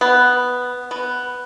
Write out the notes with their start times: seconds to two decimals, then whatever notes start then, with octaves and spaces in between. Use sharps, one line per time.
0.01 B3
0.91 B3